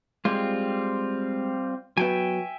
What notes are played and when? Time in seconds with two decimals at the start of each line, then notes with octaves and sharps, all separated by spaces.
0.25 G3 G#3 C4 F4
1.97 F#3 B3 E5 G5 G#5